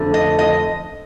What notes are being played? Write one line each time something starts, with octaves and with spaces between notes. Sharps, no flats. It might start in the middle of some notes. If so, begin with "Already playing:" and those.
Already playing: F2 D3 A3
D#5
D#5